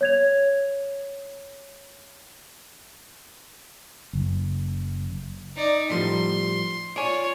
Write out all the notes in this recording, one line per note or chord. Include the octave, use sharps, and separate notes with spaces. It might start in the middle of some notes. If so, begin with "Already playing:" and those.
C#5 G#6 F7
F#1
D#4 D5
A2 F3 G3 C6
F4 C#5 D5 G#5